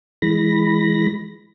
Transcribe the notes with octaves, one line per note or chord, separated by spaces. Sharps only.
E3 G#3 B5 A#6